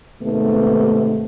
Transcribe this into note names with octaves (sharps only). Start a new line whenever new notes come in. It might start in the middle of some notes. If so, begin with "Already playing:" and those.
D#2 G#2 C3 A3 B3